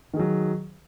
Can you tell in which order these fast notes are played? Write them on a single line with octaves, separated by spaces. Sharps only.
D#3 G#4 F#3